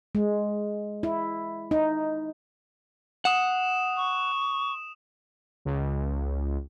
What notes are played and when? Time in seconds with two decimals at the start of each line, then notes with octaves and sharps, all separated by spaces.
0.15 G#3
1.03 E4
1.71 D#4
3.25 F#5 D#6 E7
3.97 C#6
5.65 C#2